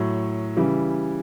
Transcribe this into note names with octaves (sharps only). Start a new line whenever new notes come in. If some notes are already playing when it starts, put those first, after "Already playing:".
Already playing: A2 F#3
C#3 E3 G3